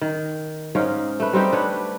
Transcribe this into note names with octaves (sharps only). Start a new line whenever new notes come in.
D#3
G#2 C#4 D#4 F5
A3 B4
G3 C4 D#4 G4
D4 B4 C#5